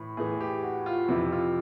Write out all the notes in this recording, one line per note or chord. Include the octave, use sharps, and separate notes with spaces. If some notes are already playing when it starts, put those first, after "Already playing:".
Already playing: A2 E3
A2 E3 G#4
G4
F#4
F4
F2 C3 E3 E4
F4